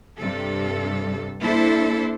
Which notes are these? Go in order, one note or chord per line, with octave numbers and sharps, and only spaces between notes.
G2 C3 A4
A#3 D4 E4 A4 C5